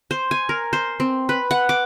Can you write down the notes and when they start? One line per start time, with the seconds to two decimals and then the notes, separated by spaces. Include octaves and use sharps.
0.11 C5
0.31 G#5
0.49 A#4
0.73 C5
1.00 C4
1.29 B4
1.51 F#5
1.69 D6